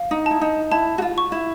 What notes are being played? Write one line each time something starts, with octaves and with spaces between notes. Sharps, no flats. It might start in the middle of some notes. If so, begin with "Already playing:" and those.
Already playing: F5
D#4
E4 A5
D#4
E4 A5
F#4
F4
C#6
E4